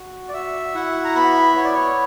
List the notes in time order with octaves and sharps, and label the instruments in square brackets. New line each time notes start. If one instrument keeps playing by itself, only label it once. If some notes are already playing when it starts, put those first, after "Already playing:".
Already playing: [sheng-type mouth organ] F#4
D5
F#4 E5
E4 F#5
A#5
B3 B5
B3 C#5
D5
C#5